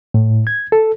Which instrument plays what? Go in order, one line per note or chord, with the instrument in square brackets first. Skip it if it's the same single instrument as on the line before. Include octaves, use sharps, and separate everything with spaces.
[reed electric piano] A2
G#6
A4